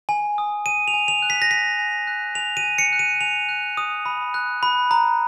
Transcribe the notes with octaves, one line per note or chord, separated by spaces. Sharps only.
G#5
D#6
G#5 D#7
F7
G#5
F7
F#6
B6
A#6
G#5 B6
G#5
F#6
G#5 F7
D#7
G#5
C#7
F#6
D#7
G#5 F7
F#6
D#6
B5
F#6
B5
A#5